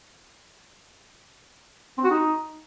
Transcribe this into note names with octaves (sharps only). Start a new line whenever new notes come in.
C4
F#4
D#4